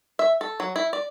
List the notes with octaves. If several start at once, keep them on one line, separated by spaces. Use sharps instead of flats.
E5
A4
F#3
E4
D5